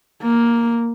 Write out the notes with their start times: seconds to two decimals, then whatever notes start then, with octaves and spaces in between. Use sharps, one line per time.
0.23 A#3